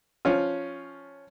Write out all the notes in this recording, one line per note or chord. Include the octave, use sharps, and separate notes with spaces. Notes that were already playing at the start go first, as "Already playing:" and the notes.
F3 C#4 F4